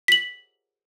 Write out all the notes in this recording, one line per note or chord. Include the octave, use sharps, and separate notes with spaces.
B6 F#7